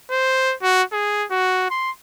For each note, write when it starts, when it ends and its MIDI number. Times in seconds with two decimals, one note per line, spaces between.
0.11 0.55 72
0.63 0.83 66
0.92 1.25 68
1.31 1.67 66
1.71 1.91 84